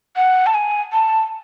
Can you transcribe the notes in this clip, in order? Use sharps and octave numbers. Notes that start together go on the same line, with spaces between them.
F#5
A5
G#5
A5